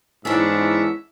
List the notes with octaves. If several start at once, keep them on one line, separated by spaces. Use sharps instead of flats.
G#2 E3 B3 C#4 D4 G#4 E5